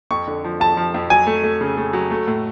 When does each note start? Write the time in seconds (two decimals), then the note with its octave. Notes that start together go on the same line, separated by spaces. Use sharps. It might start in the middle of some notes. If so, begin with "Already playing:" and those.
0.11 F2 C#6
0.28 D3
0.44 F3
0.60 F2 A5
0.77 F3
0.94 F2
1.10 F#3 G#5
1.27 A3
1.44 A3
1.61 C#3
1.77 A3
1.93 F#3
2.11 A3
2.27 A2